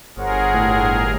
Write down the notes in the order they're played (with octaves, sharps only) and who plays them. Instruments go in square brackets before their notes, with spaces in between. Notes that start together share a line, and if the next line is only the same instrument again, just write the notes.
[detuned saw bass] G1 [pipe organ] G#4 A#4 [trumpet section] C5 C#5 F#5
[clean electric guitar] A2